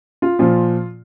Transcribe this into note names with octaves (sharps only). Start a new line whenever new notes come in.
F4
A#2 F3 F4